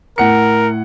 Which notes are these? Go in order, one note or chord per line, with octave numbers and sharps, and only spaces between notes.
A2 A#4 F#5 C#7